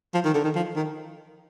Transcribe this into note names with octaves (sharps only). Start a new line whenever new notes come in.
F3
D#3
D3
D#3
F3
D#3